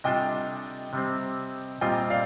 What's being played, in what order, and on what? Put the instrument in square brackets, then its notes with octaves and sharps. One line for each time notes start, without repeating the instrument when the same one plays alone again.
[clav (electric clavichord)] C3 G3 D4 F4 A4 [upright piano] D#5 G5
[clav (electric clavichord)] C3 G3 C4
[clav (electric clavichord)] A#2 G3 C4 F4 [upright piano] D#5 G5
[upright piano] D5 F5